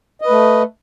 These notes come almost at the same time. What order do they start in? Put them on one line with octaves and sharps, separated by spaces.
D#5 B4 A3